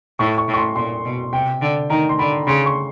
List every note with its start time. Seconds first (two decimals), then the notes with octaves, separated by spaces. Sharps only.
0.19 A2 C#6
0.38 C#6
0.48 A2
0.54 C#6
0.57 C6
0.76 A#2 C6
1.05 B2
1.33 C3 G5
1.62 D3
1.90 D#3 A#5
2.09 C6
2.19 D3 B5
2.47 C#3 C6
2.66 C#6